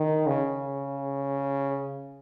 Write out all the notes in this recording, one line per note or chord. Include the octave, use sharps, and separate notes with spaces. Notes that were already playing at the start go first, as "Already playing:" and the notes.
Already playing: D#3
C#3